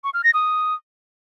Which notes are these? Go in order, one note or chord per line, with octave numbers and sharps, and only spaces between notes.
C#6
F6
A#6
D#6